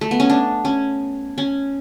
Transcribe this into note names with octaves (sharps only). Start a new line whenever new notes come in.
A3
B3
C#4
D4
C#4
C#4